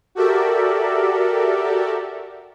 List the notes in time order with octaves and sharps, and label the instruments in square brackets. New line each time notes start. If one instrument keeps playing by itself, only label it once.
[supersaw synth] F#4 G4 A4 A#4 D5 E5